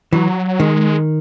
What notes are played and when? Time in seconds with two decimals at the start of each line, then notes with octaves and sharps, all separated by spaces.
0.13 E3 F#3
0.59 D#3 G#3